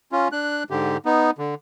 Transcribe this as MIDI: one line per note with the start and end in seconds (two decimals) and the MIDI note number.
0.12 0.28 61
0.12 0.28 65
0.32 0.63 62
0.32 0.63 90
0.70 0.97 44
0.70 0.97 50
0.70 0.97 67
1.05 1.31 59
1.05 1.31 63
1.38 1.55 50